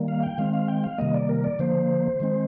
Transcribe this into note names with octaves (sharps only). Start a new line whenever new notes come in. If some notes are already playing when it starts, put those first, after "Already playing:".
Already playing: D#3 G3 A#3
F5
G5
D#3 G#3 C4 F5
F5
G5
F5
C3 D#3 G3 A#3 D#5
D5
A#4
D5
D3 F3 A#3 C5
D#3 G#3 C4